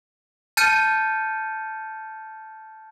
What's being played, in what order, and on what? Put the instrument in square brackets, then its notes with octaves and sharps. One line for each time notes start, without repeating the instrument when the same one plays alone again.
[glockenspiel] A5 F6 G6 A6 C#7 D#7